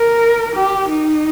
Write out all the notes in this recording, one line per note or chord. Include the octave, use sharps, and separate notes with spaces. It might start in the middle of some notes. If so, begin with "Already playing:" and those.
Already playing: A#4
G4
D#4